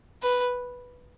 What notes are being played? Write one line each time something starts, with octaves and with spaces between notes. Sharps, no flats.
B4